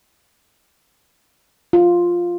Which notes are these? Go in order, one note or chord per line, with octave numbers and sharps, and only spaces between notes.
F4